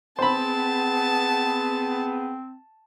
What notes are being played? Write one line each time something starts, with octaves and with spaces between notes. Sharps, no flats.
B3 C4 G#4 C5 A5 B5